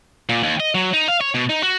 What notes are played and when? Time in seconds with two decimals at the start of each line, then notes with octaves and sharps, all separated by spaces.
0.29 A#2
0.43 D#2
0.60 D#5
0.75 F#3
0.94 D#4
1.08 F5
1.21 C#5
1.35 B2
1.49 D#4
1.63 F#4